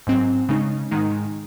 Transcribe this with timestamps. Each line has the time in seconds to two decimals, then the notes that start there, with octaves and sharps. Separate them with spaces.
0.07 G#2 F#3 C4
0.49 C#3 G#3 D#4
0.91 G#2 D#3 G#3 D#4